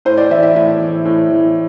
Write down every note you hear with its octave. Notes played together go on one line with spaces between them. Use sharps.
A2 C5
D5
E3 E5
E5
A2 E5
E3
A2
E3